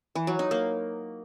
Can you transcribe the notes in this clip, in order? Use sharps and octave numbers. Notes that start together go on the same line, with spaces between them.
E3
F#3
D#4
A#3